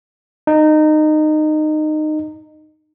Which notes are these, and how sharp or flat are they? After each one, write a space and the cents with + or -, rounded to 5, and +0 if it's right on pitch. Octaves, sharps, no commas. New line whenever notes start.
D#4 -20